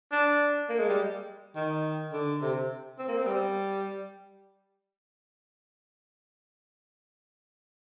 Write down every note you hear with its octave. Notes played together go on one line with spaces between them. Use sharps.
D4
A#3
G#3
G3
D#3
D3
C3
C4
A#3
C4
G3